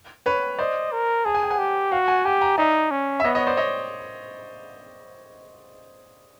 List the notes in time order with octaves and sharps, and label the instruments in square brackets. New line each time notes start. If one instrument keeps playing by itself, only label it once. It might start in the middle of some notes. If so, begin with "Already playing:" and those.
[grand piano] B4 C#5
[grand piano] C5 D5 [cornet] D#5
[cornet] A#4
[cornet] G#4 [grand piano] A5
[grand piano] G#5
G5
F#5 G#5
[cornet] G4
[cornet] F#4 [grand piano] F5 G5
[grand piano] F#5 G#5
[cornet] G4 [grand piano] F#5 G#5
[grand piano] G#5 A#5
[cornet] D#4 [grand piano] D5 E5
[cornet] C#4
[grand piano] E5
[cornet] B3 [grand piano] C#5 D#5
[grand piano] C#5 D#5
C5 D5
C#5 D#5